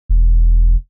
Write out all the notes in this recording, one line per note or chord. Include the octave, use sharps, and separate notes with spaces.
E1